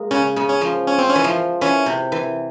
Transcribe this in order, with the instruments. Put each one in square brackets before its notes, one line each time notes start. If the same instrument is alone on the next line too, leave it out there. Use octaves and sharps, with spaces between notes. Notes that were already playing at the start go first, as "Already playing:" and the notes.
Already playing: [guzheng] G#3 A#3
[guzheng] C#3 [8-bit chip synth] C#4
[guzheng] C#3
[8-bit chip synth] C#4
[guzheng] F3
[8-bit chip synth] C#4
C4
C#4
[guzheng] E3
F3
[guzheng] E3 [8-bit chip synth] C#4
[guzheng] C3
E3